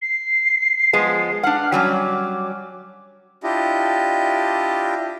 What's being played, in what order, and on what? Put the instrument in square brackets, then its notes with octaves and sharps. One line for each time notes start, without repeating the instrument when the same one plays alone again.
[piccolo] C7
[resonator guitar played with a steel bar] F3 G#3 B3
[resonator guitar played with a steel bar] D4 F#5 [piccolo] F6
[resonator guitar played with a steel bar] F#3 G3 C#4
[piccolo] D6
[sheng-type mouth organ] D4 E4 F4 G4 D#5